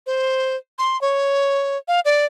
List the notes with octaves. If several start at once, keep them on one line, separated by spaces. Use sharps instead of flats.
C5
C6
C#5
F5
D5